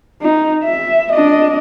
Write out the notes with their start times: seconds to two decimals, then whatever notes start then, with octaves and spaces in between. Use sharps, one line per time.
0.22 D#4
0.64 E5
1.12 D4 D#5